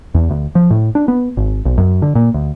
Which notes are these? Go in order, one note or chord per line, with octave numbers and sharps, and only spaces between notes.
E2
D2
F3
A2
D4
B3
G#1
B1
F#2
D3
A#2
D2